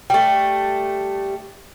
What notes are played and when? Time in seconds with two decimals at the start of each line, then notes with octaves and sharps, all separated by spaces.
0.10 G3 A3 G5